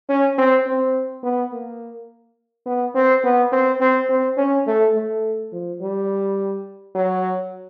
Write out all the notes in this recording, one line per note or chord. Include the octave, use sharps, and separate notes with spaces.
C#4
C4
C4
B3
A#3
B3
C4
B3
C4
C4
C4
C#4
A3
A3
F3
G3
F#3